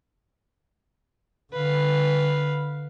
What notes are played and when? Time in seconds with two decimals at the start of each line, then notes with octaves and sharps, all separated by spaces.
1.53 D3 B4 F5